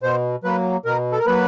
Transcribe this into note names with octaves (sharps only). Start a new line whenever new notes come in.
B2 C5
F#3 A#3 B4
B2 A#4
A4
A#4
F#3 A#3 B4